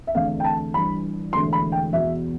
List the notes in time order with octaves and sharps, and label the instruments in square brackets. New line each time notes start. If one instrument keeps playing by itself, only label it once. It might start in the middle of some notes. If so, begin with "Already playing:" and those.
[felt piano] E5
E2 D3 A3 C4 F5
G5
A5
G1 G2 E3 B5
E1 E2 D3 A3 C6
B5
G5
E2 B2 B3 E5